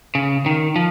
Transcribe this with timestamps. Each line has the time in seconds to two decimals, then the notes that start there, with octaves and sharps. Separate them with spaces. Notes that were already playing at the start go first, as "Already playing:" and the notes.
0.15 C#3
0.46 D#3
0.76 F3